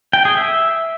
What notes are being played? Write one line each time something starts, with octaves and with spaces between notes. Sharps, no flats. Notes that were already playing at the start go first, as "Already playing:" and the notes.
G5
G#4
E5